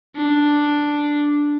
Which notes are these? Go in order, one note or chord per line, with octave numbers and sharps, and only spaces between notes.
D4